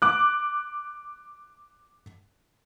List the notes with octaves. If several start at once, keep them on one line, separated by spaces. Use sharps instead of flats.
D6 F#6